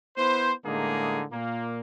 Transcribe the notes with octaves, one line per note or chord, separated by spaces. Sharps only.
B3 E4 B4 C5
A2 D3 G#3 A#3 D#4 G#4
A#2 A#3